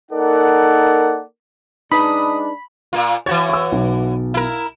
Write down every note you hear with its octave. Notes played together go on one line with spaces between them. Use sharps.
A#3 D#4 A4 A#4 D5 F#5
G#3 D4 D#4 B4 A5 B5 D#6
A#2 A#3 F4
E3 F#4 C#5 A6
C#6 E6
B1 B2
E4 A#4